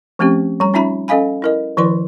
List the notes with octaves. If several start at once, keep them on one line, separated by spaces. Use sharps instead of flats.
F3 A3 C4 C#4 G4
G3 A#5
C#4 D#4 F4 E5 A#5 B5
C#4 A4 D#5 F5 G#5 B5
E4 A#4 D#5
D#3 F3 E4 B4 D5 C6